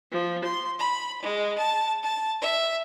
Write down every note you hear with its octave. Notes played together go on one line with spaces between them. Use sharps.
F3
C6
B5
G#3
A5
A5
E5